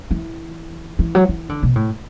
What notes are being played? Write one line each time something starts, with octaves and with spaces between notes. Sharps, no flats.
E3
E3
F#3
E3
D3
B2
A2